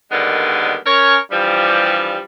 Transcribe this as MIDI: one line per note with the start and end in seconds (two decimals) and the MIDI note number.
0.11 0.76 50
0.11 0.76 51
0.11 0.76 55
0.11 0.76 56
0.11 0.76 58
0.11 0.76 59
0.86 1.18 61
0.86 1.18 70
0.86 1.18 73
1.32 2.21 43
1.32 2.21 52
1.32 2.21 53
1.32 2.21 55